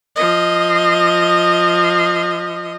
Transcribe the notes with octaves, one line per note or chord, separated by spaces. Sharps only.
F3 D#5